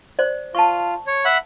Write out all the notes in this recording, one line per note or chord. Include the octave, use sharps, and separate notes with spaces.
C5 D5
F4 A5 C#6
C#5
E5 F#5 B5